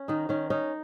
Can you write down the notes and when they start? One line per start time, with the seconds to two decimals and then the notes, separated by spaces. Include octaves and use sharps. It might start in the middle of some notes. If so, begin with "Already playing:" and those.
Already playing: C#4
0.08 D#3 D#4
0.29 D#3 C#4
0.50 C#4 D#4